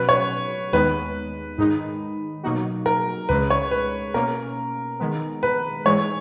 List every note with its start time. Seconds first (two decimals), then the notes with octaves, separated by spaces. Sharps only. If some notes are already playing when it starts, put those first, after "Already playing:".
Already playing: B2 F#3 C#4 F#4 B4
0.09 C#5
0.73 D#2 D#3 G#3 B3 B4
1.58 G#2 D#3 G#3 D#4
2.44 B2 F#3 A#3 D#4 F#4
2.86 A#4
3.29 C#2 C#3 G#3 B4
3.50 C#5
3.71 B4
4.14 B2 A#3 C#4 A#4
5.00 D#3 G#3 B3
5.43 B4
5.85 G#2 E3 G#3 C#5